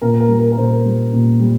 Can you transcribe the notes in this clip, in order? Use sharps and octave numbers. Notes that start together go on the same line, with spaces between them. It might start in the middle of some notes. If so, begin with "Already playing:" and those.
A#2 A#4
A#4
G3
A#4
A#4
A#2 C5
G3
A#2
G3